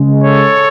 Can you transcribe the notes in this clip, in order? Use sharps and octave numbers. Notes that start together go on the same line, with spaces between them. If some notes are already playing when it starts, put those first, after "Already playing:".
Already playing: C#3 G#3
A4 C#5